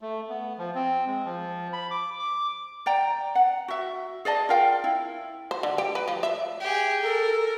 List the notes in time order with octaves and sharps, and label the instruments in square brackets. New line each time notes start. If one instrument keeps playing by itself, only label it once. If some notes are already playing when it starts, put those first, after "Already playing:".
[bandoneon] A3
B3
F3
C4
G#3
F3
B5
D6
D6
[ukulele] D5 G5 A#5
F#5
F#4 E5
G#4 D5 D#5 A5
F4 A#4 F5 G5
E4
[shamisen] C5
D3
G4
B4
F3
E5
[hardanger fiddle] G4 G#4
[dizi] A4 [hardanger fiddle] A#4